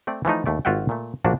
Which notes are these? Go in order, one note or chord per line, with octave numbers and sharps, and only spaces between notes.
A3 C4 D5
E3 F3 A3 D#4
D#2 A3 D5
G#1 F4 F#4 E5 F#5 G5
A#2 A3
A#1 F3 A#3 D4 F#4